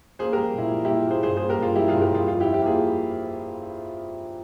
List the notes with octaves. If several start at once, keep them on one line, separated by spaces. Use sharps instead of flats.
A#3 G#4 C5
G4 A#4
G3
A#2 E4
G3
A#2 E4 G4
A#3 G#4 C5
G2 G#4 C5
G#4 C5
A#3
G4 A#4
G2 F4 G#4
G3 E4 G4
G2 F4 G#4
G4 A#4
G2 F4 G#4
F2 F4
F2 E4 G4
E4 G4
A#3 F4 G#4